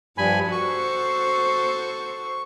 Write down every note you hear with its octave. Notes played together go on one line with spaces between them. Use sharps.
G2 F3 G#5 B5
F#4 A4 C5 C#6